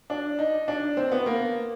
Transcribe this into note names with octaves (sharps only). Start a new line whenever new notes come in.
D4
D#4
D4
C4
B3
A#3